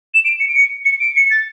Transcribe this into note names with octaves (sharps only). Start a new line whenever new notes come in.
E7
D7
C#7
D7
C#7
C#7
D7
C#7
A6